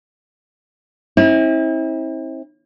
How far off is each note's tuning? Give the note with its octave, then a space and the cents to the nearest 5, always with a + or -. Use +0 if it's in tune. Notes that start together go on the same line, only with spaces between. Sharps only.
C4 +35 E4 -35